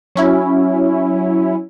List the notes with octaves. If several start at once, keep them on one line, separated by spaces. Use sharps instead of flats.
F#3 C#4 E4